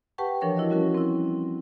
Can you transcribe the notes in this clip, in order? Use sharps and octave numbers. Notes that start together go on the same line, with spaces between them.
G4 B4 F#5 G5 A5 C#6
E3 F3 D4 A#4 C#5 C#6
E4 F#4 D#5
F3 G3 C#4 F#4 A#4
C4 E4